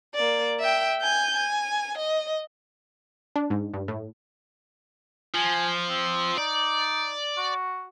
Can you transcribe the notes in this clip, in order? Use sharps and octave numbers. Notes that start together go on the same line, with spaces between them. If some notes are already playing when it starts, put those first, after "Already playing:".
A#3 D5
E5 G5
G#5 G6
G#5
D#5
D4
G#2
G2
A2
F3 G#5
C4
D#4 D5
F#4